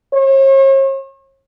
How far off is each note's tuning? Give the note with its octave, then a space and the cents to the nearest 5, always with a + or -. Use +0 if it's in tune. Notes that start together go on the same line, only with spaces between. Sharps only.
C#5 -45